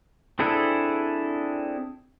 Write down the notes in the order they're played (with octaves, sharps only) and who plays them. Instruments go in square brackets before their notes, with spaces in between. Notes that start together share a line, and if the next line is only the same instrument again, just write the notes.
[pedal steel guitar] C4 D4 E4 G#4 A4